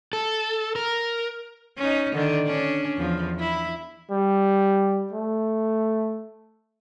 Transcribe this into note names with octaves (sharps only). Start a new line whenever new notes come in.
A4
A#4
C#4 D#4
D3 D#3 D4
C#4 D4
E2 F3
E4
G3
A3